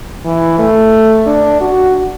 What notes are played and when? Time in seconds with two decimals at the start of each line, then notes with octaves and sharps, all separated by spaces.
0.25 E3
0.59 A3
1.26 D4
1.61 F#4